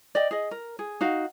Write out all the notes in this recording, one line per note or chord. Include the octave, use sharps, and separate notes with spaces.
D5 D#5 G5
G#4 D#5
A#4
G#4
D#4 F#4 F5